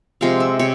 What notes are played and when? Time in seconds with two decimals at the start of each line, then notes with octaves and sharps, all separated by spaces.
0.21 C3 F3 G#3 F5
0.40 E5
0.59 C3 C#5